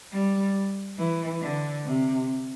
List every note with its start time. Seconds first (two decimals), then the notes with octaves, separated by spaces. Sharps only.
0.12 G3
0.98 E3
1.41 D3
1.84 C3